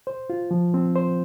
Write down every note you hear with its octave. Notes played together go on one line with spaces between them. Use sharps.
C5
F4
F3
C4
C5